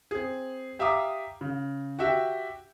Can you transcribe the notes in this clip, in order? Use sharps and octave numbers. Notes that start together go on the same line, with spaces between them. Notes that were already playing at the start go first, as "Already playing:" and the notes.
C4 G#4
G4 E5 F5 A#5 D6 D#6
C#3
F#4 G4 E5 F#5 G5